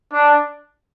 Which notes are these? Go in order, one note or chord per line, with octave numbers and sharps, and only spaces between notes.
D4